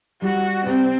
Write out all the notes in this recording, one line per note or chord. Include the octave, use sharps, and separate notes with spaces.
G3 F#4
C3 C4